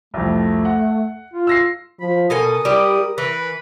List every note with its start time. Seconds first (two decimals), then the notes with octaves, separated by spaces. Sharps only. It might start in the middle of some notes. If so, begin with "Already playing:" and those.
0.14 C2 F2 A3
0.65 F#5
1.34 F4
1.47 E6 A#6 C7
2.00 F3 B5
2.30 B2 A4 A#4 G#5 D#6
2.65 G3 E4 G4
3.18 E3 B4